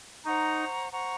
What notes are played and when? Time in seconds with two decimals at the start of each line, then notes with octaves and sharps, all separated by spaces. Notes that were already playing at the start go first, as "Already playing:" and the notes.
0.25 D#4 C5 F#5 A#5 C#6
0.91 C5 F#5 A#5 C#6